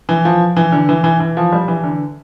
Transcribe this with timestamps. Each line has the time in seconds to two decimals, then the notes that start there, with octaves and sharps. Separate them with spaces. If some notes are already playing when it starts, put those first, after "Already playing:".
0.09 E3
0.25 F3
0.57 E3
0.72 D3
0.89 E3
1.04 E3
1.20 E3
1.37 F3
1.52 G3
1.68 E3
1.84 D3